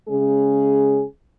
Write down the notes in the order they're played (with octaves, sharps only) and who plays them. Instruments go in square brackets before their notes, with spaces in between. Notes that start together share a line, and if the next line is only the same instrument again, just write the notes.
[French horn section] C#3 G#3 C#4 G#4